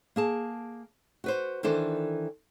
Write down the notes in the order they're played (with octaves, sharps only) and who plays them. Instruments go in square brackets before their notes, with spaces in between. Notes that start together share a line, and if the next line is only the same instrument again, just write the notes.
[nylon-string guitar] A#3 G#4 A5
F#4 B4 C5
D#3 E3 D4 A4 C5